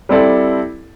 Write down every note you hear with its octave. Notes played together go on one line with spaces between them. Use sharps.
G3 C4 E4 A4 D5